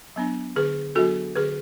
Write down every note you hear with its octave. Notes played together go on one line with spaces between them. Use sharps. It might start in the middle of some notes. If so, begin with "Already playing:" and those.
F#3 B3 D4
D3 G#4 B4
F#3 B3 D4 F#4 A4
D3 G#4 B4